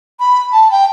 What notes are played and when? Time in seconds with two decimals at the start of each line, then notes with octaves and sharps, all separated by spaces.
0.20 B5
0.52 A5
0.71 G5